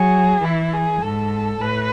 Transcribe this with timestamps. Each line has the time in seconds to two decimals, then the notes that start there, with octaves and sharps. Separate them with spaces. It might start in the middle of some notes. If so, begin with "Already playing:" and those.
Already playing: F#3 G#4
0.43 E3 E4
0.73 G#4
1.02 G#2 A4
1.60 A2 B4